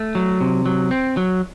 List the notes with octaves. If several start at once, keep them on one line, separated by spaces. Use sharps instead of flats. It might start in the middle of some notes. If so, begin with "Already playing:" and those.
Already playing: A3
F#3
C3
F#3
C4
F#3